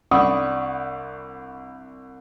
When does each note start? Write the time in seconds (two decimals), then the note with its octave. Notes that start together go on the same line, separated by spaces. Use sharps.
0.11 C2 D4 F#5 B5 C#6 D#6